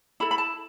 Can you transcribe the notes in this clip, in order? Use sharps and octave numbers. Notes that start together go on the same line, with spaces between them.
E4 A4 B5
B5
A5